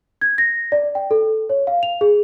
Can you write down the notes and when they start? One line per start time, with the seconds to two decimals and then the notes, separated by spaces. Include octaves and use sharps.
0.21 G#6
0.38 A#6
0.72 D5
0.95 G5
1.11 A4
1.50 C#5
1.67 F5
1.83 F7
2.01 G#4